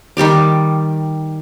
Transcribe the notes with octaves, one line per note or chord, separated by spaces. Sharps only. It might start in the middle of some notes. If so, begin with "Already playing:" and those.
D#3 G3 G4 D5